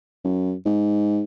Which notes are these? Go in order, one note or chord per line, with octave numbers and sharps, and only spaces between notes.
F#2
G#2